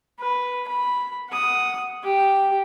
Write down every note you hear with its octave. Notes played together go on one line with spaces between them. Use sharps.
B4
B5
F#5 D#6
G4 G5